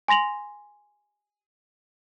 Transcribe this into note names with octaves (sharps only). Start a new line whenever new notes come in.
G#5 C6 A#6 F7 F#7